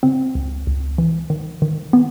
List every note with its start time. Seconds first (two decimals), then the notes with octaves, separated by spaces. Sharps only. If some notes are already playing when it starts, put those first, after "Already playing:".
0.03 C#3 C4
0.35 C#2
0.67 C#2
0.98 E3
1.30 D#3
1.62 D#3
1.93 B3